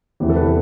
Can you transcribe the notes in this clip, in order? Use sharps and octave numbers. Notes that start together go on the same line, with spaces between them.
E2 C3 E3 G4
A4
B4